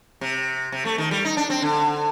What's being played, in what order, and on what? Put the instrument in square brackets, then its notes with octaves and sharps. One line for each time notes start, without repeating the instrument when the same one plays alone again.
[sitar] C3
C3
A3
D#3
G3
D#4
D4
C4
D3